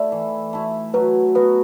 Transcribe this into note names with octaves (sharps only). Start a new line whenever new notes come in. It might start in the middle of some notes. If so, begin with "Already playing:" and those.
Already playing: A3 E4 D5
E3
A3 E4
F#3 B4
B3 F#4 B4